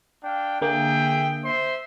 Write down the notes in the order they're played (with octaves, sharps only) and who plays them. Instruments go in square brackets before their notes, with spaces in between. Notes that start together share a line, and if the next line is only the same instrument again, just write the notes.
[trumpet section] D4 F5 G5
[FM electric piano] D3 A#3 [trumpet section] G#4 E5 G5
[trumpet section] C5 E5 C6